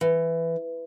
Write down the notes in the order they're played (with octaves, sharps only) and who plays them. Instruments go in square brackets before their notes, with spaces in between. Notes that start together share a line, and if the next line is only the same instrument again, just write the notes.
[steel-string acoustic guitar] E3